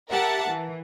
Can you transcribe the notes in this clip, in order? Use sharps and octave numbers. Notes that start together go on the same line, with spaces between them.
G4 A#4 E5 F#5 A5
E3